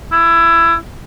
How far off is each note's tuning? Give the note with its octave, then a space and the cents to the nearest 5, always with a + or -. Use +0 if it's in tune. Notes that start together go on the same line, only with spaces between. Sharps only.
E4 +20